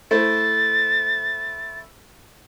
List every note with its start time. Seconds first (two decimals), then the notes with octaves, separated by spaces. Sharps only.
0.11 A3 E4 C5 A6